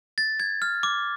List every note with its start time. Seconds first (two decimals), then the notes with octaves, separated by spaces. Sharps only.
0.18 A6
0.40 G#6
0.62 F6
0.83 D6